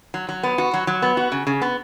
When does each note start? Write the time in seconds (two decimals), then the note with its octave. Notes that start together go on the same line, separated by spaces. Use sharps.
0.14 F#3
0.29 F#3
0.43 B3
0.58 F#4
0.74 F#3
0.87 F#3
1.02 B3
1.17 F#4
1.32 C#3
1.47 C#3
1.62 B3